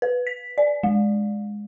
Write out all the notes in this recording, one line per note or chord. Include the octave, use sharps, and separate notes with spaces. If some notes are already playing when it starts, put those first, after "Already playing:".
B4
B6
D5
G#3